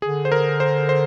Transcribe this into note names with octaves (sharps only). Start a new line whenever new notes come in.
D3 G#4
C5
A#4
C5
C5